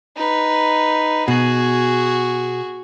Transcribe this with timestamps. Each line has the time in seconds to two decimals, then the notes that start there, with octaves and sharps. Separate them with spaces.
0.17 D#4 B4
1.28 B2 F#4 G#4